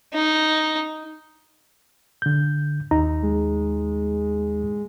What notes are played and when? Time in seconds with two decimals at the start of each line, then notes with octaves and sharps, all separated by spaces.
0.14 D#4
2.22 D3 G6
2.91 D#2 D#4 A#5
3.22 G#3